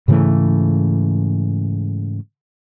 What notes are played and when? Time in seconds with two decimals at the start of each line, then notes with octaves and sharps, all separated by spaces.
0.08 G#2 C#3 E3 A3